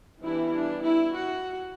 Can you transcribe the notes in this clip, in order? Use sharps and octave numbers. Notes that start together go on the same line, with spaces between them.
E3 G3 B3 D4 E4
D4
E4
F#4